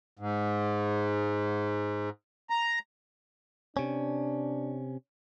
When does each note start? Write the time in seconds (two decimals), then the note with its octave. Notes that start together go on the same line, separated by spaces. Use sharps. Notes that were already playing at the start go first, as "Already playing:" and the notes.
0.19 G#2
2.50 A#5
3.77 C3 C#4 D4